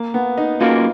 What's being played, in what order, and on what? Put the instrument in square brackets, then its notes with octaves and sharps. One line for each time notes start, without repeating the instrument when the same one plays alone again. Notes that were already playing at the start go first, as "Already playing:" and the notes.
Already playing: [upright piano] A#3
B3
D#4
[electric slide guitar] A#3 C#4 F#4 A#4 [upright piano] F4